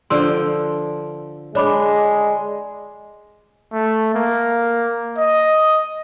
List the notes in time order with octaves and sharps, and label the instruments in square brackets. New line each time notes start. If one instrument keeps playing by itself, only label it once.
[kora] D3 F3 G5 [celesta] C6 E6
[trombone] G#3 [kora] D4 [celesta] C#5 B5 D6
[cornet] A3
A#3
D#5